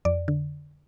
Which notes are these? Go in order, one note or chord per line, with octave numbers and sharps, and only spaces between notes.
F2 D5
D3